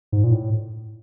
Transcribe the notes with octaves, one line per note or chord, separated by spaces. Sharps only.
G#2
A#2
A2